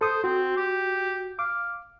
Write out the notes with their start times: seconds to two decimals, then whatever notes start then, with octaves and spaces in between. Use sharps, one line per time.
0.01 A4 C5 D#6
0.24 C4 F#4
0.57 G4
1.39 F5 D6